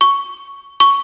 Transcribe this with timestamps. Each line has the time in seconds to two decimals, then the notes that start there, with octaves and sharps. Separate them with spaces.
0.01 C#6
0.80 C#6